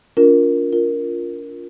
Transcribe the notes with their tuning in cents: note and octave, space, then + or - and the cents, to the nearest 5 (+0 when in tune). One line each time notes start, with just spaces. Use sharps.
D4 -45 F4 +10 A#4 +0
F4 +0 A#4 +0